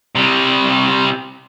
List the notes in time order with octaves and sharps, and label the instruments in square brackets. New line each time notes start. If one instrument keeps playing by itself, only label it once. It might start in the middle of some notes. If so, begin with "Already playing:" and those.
[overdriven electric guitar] C3 G3